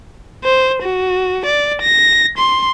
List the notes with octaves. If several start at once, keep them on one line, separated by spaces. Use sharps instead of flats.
C5
F#4
D5
A#6
C6